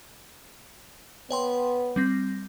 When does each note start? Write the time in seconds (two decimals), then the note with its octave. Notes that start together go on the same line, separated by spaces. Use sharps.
1.31 B3 C#5 G5 C6
1.96 G3 C4 A#6